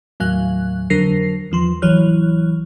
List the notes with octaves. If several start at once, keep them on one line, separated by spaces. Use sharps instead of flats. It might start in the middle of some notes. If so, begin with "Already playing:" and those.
D#2 A2 F#3 F5 G#5 F#6
F2 D3 F#3 A#4 A#6 C7
E2 F3 C6
A1 E3 F#3 C#5 F6 F#6